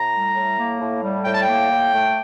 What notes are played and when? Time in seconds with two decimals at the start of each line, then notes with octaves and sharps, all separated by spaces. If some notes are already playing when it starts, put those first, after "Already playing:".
Already playing: A2 A#5
0.13 G3
0.35 A2
0.58 A#3
0.80 A2
1.02 G3
1.25 A2 G5
1.34 A5
1.43 A#3 G5
1.70 A2
1.93 A3